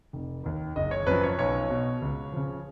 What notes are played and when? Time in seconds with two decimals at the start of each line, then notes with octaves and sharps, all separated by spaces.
0.13 F1
0.44 D#2 D#3
0.76 F#1 D#5
0.91 C#5
1.06 F#2 F3 B4
1.23 C#5
1.39 B1 C#5
1.70 B2
2.02 C#2
2.33 C#3 F3